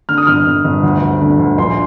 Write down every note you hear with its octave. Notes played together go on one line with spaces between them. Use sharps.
D3 F6
D#6
G1 F6
G1
G1
D2
D2
D3
D2
A#1 C6